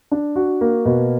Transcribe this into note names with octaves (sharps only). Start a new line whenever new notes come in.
D4
F#4
A#3
B2